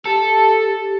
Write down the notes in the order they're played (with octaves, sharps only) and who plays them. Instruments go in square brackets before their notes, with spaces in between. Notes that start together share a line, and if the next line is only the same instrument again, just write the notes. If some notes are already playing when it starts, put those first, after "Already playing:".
[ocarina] G4 [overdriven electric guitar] A4